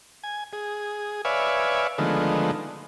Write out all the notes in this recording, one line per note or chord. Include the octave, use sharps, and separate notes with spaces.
G#5
G#4
B4 C#5 D5 E5 F5 G#5
D3 D#3 F3 G#3 A3 B3